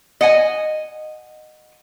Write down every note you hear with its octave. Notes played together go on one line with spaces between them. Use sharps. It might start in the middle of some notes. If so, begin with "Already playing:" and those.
D#5 F#5 G#5